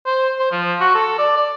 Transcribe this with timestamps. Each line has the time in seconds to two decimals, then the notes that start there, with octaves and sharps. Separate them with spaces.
0.06 C5
0.39 C5
0.52 F3
0.81 F#4
0.95 A4
1.19 D5
1.37 D5